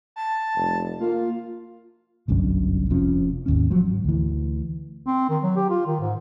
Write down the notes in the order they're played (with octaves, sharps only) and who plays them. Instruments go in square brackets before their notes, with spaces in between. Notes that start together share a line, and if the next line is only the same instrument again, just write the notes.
[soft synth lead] A5
[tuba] F1
[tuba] A#3 [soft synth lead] F4
[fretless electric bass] G1 C2 F#2 D4
F1 F2 F3 C#4
G#1 D#2 C#4
F3 F#3
G#1
D2 E3
[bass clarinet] C4
D#3
F#3
G4
F4
D#3
G#2